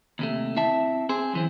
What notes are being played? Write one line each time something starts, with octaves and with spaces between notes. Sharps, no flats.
D#2 C3 A3
C4 E4 E5 A5
C4 G#4 C5
F#2 E3 C4